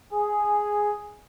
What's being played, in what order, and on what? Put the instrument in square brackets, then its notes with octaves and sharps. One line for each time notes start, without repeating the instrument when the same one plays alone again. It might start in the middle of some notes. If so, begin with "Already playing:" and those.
[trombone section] G#4